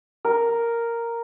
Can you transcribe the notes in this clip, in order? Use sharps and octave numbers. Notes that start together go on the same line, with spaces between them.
A#4